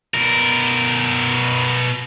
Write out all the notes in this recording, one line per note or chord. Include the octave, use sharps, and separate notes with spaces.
B2 A#4